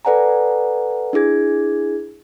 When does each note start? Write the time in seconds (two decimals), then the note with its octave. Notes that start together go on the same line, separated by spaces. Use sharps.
0.05 A4 B4 D5 F#5 G#5 A#5
1.13 D4 E4 G#4 G#6